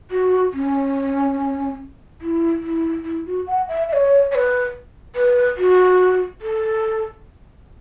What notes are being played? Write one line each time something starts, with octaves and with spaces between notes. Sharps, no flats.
F#4
C#4
E4
E4
E4
F#4
F#5
E5
E5
C#5
C#5
B4
B4
F#4
A4